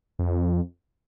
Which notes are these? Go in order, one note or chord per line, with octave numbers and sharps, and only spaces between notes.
F2